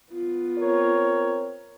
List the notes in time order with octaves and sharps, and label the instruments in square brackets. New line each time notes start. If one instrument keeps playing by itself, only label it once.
[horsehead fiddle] B3 F4
[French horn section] C4 A#4 C#5